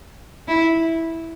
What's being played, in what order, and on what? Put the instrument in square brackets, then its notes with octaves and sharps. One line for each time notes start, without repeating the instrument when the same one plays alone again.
[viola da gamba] E4